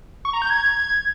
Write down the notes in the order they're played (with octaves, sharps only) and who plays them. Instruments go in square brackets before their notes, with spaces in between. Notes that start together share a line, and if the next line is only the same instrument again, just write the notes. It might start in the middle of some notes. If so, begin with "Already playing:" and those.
[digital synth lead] C#6
A#5
G6
G#6